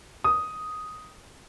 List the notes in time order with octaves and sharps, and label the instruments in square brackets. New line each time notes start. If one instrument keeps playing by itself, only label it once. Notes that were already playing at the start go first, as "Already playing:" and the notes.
[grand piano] D#6